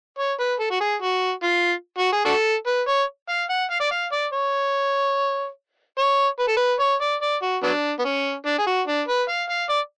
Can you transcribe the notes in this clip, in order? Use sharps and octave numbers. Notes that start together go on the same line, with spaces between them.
C#5
B4
A4
F#4
G#4
F#4
F4
F#4
G#4
D4 F#4 A4
B4
C#5
F5
F#5
F5
D5
F5
D5
C#5
C#5
B4
A4
B4
C#5
D5
D5
F#4
F#3 B3 D4
B3
C#4
D4
G#4
F#4
D4
B4
F5
F5
D5